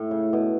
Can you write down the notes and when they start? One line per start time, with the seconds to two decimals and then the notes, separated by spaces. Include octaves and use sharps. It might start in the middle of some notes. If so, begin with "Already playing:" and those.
Already playing: A2
0.11 C#3
0.33 B2